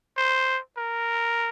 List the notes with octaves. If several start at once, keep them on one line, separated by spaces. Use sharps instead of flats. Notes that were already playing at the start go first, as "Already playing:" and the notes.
C5
A#4